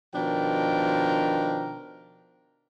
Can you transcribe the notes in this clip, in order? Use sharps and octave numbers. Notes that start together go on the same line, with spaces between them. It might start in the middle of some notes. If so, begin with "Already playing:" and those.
B2 D#3 F3 D4 A#4 G5